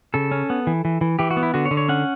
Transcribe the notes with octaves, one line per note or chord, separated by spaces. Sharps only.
C#3 A4
C#4
B3
E3
E3
E3
E3 G4
F#4
B3
E4
D3 F#4
C#5
D3
C#5
C#4 F#5